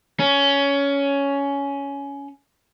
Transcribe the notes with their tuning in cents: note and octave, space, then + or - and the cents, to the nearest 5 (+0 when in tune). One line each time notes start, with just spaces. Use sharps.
C#4 +15